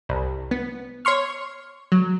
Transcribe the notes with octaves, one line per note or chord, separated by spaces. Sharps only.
C2
B3
C#5 C6 C#6 F6
F#3